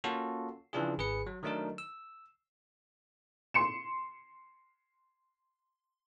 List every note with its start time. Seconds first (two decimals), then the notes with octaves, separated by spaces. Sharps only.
0.04 A#3 C#4 F4 F#4 A4
0.73 C#3 E3 F3 D4 F4 G#4
0.98 G#1 G#4 B4 C#7
1.27 F#3
1.43 D#3 F#3 A3 D4 D#4 A#4
1.78 E6
3.54 C6 C#7 E7